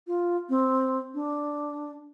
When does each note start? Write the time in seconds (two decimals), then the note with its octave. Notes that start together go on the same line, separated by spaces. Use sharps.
0.07 F4
0.49 C4
1.14 D4